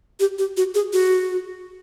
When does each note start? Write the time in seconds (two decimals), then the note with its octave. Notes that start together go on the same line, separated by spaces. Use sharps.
0.20 G4
0.38 G4
0.57 F#4
0.75 G#4
0.93 F#4